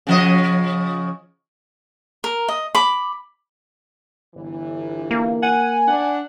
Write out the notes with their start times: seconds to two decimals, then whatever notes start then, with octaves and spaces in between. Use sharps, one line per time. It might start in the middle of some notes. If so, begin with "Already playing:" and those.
0.07 C#3 F3 D#5
2.24 A#4
2.48 D#5
2.75 B5 D6
4.35 G1 E3
5.11 A#3
5.42 F#5 G#5
5.87 D4 F#5